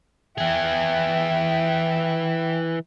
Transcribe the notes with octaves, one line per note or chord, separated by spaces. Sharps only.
E3 G#4 E5 G5